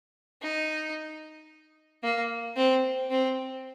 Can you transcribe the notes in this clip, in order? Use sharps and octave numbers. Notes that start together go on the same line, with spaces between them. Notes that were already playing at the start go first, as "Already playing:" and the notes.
D#4
A#3
C4
C4